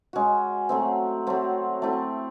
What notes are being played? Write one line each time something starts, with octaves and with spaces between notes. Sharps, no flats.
G#3 C#4 F#4
F#3 A3 C4
F#3 A3 C4
A3 C4 E4